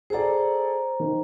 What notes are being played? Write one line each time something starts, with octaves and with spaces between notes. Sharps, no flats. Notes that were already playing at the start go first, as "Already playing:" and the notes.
G#4 A4 C5 D5 A#5
D#3